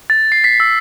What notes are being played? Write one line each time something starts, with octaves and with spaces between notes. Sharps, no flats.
A6
C7
B6
E6